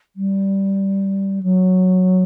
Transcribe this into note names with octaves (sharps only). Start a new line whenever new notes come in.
G3
F#3